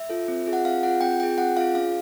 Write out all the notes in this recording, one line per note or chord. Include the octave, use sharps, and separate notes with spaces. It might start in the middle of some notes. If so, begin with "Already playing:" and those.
Already playing: E5
F4 A4
C4
F4 G#4
F#5
C4 F5
F4 G#4 F#5
C4 G5
F4 G#4 G5
C4 F#5
F4 G#4 F5
C#4 F5